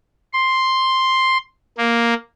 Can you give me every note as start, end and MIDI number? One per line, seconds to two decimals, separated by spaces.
0.33 1.38 84
1.78 2.14 58